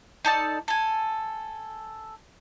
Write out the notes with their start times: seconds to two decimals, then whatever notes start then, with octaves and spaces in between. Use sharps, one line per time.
0.25 D#4 A4 D5 A5
0.68 A4 G#5